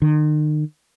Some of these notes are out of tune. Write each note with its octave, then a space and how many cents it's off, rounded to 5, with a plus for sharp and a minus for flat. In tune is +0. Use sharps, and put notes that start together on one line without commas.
D#3 -40